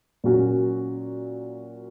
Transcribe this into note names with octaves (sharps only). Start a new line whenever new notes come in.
A#2 F#3 C#4 F#4